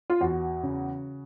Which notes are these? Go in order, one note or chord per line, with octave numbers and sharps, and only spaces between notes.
F4
E2 F#4
C#3